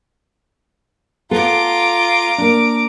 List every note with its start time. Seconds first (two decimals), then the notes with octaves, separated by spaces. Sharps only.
1.31 B3 F4 A4 A#5 D6
2.38 A#3 D4